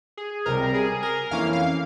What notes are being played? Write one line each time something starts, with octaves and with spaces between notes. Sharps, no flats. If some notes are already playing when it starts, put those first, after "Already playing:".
G#4
C#2 C3 G3 A#4
G#4
A#4
F2 E3 A#3 C#4 F5
F5